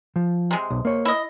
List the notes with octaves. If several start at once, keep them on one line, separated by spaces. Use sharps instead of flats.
F3
C3 G#3
B1
A#3 C#5
E4 D#5